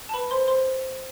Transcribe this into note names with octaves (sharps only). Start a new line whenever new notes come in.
A5
B4 B5
C5 C6
C5 C6